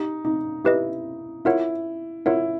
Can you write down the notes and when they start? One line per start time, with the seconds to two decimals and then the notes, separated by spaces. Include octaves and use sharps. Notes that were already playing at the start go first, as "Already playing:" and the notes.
Already playing: D#4 G4
0.25 D#4
0.64 E4 G4 B4 D#5
1.45 E4 F4 A#4 C#5 F#5
2.26 E4 F4 A#4 C#5 F#5